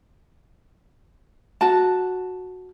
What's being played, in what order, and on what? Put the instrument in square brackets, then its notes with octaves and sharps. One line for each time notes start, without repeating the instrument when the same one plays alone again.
[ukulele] F#4 A5